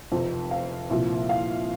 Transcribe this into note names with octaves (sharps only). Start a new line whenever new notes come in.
F1 F2 C3 F3
F5
C2 A#2 F3
F5